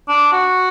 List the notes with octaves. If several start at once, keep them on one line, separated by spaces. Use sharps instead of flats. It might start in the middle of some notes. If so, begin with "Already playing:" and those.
D4
F#4